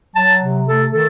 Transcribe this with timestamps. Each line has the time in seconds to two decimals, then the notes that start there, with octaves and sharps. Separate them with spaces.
0.15 F#3 A5
0.41 C3
0.67 A3 A4
0.92 D#3 A4